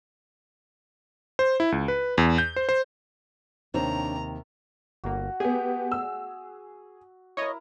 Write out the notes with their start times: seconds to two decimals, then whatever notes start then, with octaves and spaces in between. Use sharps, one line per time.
1.39 C5
1.60 E4
1.72 C#2
1.88 B4
2.18 E2
2.38 G6
2.56 C5
2.69 C5
3.74 D#2 C3 D4 C5 C#5 A#5
5.04 G1 A#3 F#4
5.40 B3 G4 G#4
5.92 E6
7.37 E4 A#4 C#5 D#5